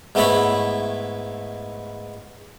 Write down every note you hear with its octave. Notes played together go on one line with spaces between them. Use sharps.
G#2 A3 B3 E4 C#5 B5